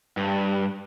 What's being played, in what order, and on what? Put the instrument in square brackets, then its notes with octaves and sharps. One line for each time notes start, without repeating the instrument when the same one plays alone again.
[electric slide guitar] G2